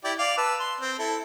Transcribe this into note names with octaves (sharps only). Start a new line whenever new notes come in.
E4 G4 D5
D5 F5 D6
B4 A5 E6
C6
C4
E4 A4